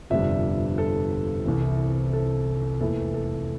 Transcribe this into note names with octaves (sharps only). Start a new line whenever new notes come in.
G1 F2 C3 G3 D4 E5
A4
C2 C3 E3
A4
F1 E2 E3 A#3 E4 A4
A4